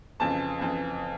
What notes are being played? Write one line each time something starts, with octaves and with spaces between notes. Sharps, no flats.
F2 C#3 E3 A5
F2 C#3 E3